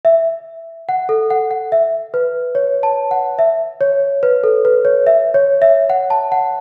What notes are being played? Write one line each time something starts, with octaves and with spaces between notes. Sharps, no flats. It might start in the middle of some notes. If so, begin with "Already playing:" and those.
E5
F#5
A4
F#5
F#5
E5
B4
C#5
A5
F#5
E5
C#5
B4
A4
B4
C#5
E5
C#5
E5
F#5
A5
F#5